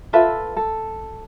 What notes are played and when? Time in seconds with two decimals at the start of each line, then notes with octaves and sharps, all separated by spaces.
0.13 F4 A4 B4 E5
0.56 A4